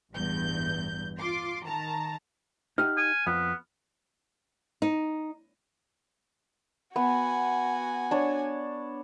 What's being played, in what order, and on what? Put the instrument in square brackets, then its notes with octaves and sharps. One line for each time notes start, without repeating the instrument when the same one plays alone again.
[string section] A1 E2 G2 G6
F4 C6 D6
D#3 A5 A#5
[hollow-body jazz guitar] D#4 G4 F#5 [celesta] F6
[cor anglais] G#5
[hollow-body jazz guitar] F2 [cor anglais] B3
[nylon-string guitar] D#4
[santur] B3 [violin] F#4 G#5
[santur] D4 C#5